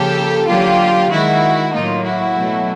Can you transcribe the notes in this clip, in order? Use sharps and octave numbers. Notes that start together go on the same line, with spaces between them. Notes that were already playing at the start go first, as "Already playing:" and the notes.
Already playing: C#3 F3 A#3 G4 A4
D3 F#3 A#3 F4 G4
D#3 G#3 E4 F#4
A2 F#3 A#3 D#4 F4
E4 F#4
B2 F#3 A3